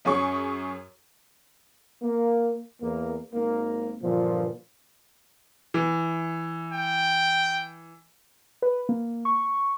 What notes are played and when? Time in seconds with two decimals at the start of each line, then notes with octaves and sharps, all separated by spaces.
0.05 F#2 C#4 G#4 C#6
2.02 A#3
2.82 E2 A#3
3.33 G#1 A#3
4.01 G2 A#2 D3 E3 F3
5.74 E3
6.73 G5
8.62 B4
8.89 A#3
9.25 C#6